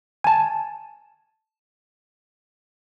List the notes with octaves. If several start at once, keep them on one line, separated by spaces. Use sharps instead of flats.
G#5 A5